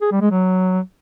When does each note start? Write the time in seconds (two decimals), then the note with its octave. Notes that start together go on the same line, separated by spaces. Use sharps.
0.01 G#4
0.11 G3
0.21 G#3
0.31 F#3